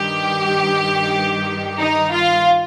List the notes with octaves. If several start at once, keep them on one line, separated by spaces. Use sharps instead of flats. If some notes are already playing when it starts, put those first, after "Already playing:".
Already playing: G2 D#3 G4
D#4
F4